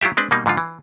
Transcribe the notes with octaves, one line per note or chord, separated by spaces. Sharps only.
F#3 E4 F4 G4 E5
G#3 C4 D4 B4
B2 G3 A#3 D#4
G#2 D3 F3 F4
E3